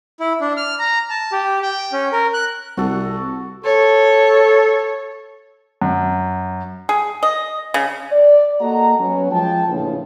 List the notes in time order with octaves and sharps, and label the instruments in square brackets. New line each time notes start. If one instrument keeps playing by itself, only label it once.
[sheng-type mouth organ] E4
D4
F6
A#5
A5
G4
G5
C#4
A#4
F#6
[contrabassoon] C2 [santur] F#4 A4
[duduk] A4 [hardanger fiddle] C#5
[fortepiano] F#2
[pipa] G#4
D#5
C#3
[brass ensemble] D5
A#3 F#4 A4 D#5 F#5 A#5
F#3 B3 C#4
F3 G#3 G5 A5
A#1 F2 A2 C#3 E3 F3